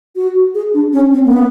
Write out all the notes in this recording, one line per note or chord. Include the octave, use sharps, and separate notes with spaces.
F#4
G#4
D4
C#4
C4
A#3
B3